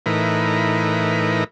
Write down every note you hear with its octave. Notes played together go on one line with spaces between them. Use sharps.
A2 E3 D#4 A#4 B4